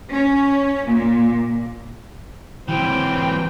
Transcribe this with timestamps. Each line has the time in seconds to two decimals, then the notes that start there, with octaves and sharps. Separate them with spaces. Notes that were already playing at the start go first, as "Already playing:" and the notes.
0.10 C#4
0.86 A#2
2.68 E3 F#3 C4 G5